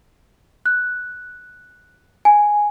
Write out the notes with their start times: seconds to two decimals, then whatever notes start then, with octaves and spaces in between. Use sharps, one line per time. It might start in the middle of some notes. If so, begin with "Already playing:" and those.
0.66 F#6
2.25 G#5